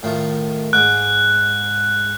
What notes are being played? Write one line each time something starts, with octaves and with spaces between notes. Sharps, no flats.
A2 D#3 F3
G#2 D6 F#6